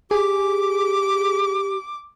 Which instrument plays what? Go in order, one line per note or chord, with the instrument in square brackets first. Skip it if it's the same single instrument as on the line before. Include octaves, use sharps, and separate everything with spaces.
[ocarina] G4 [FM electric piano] G#4 [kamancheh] D6